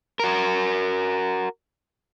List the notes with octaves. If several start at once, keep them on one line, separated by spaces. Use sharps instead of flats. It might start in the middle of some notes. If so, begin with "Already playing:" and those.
F#4 A#4